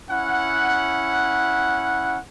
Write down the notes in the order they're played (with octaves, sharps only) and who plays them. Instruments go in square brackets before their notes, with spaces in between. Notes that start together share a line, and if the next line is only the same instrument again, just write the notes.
[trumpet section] C#4 E4 F#5